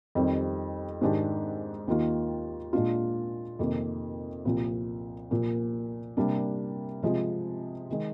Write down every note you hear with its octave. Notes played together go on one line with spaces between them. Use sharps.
F2 D#3 G3 C4 G4
G#2 D#3 G#3 D4 G4
D#2 D#3 A#3 F4
A#2 G#3 D4 F4
F2 C3 D#3 A#3
C2 A#2 F3
A#2 F3 A#3
C3 G3 A#3 D4
C3 F3 G#3
D#3 G#3